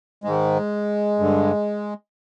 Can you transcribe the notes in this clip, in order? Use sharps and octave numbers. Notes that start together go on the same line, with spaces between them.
G#2 D#3 G#3
G2 D3